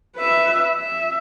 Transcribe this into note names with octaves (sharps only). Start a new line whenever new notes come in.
B4 E5
E5